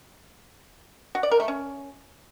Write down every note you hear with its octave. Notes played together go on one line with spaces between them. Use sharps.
F#4
D5
A#4
A3
C#4